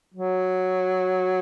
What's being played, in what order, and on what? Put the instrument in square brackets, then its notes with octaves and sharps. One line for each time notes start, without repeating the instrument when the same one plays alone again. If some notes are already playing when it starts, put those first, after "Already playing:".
[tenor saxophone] F#3